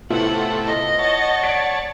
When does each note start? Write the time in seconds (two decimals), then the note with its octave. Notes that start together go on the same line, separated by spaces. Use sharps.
0.10 A2 C3 A3 B3 E4 F4 F#5
0.66 D#5
0.99 C#5 F#5 A5
1.43 D5 G#6 B6 D7